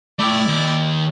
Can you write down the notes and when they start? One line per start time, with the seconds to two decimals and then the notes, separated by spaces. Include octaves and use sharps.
0.19 A3 E4 D5 G5
0.48 D#2